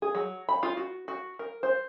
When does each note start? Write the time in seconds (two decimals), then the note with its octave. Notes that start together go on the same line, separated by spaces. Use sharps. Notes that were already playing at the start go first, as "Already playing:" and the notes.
0.02 G#4
0.15 F#3
0.49 B5
0.63 F4
0.77 F#4
1.08 F#4
1.39 A#4
1.63 C5